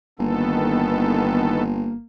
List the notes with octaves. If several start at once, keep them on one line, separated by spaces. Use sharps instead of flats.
G1 D#3 A#3 B3 A4